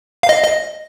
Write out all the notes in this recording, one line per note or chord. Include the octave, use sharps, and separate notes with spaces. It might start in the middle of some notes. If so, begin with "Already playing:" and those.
F5
D#5
D#5